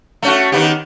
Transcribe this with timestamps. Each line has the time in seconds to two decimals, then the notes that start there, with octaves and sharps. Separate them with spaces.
0.22 A3 C#4 F#4
0.52 D#3 B3 G4